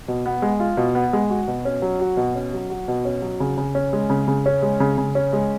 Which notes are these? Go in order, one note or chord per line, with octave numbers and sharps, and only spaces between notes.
B2
B3
G#3
F4
B2
B3
G#3
F#4
B2
C#4
F#3
F#4
B2
C#4
F#3
F#4
B2
C#4
F#3
C#3
C#3
C#4
G#3
C#3
C#3
C#4
G#3
C#3
C#3
C#4
G#3